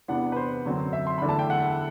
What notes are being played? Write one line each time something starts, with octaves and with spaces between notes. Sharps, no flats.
E2 C3 E3 B3 D4 F#5
B4
C5
F#2 D3 F#3 C4
E5
C6
E2 D3 A3 D4 B5
A5
G5
F#5